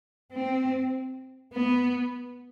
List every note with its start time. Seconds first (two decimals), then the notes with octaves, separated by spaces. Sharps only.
0.32 C4
1.53 B3